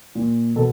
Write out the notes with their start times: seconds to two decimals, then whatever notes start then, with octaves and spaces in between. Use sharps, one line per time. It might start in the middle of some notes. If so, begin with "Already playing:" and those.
0.15 A#2
0.56 B2 A4